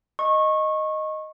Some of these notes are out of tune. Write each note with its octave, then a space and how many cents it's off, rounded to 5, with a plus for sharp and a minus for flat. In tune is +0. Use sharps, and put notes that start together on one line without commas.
D#5 +0 C#6 -25